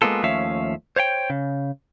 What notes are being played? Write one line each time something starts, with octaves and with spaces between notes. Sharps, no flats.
G#3 A#3 B3 F4 A4
D#2 F3 A3 C#4 E5 F5
C5 C#5 F5 G5
C#3